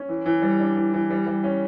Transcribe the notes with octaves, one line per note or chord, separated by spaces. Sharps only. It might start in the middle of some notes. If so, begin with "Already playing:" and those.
Already playing: C#4
E3
E3
G3
D4
E3
E3
G3
G3
C#4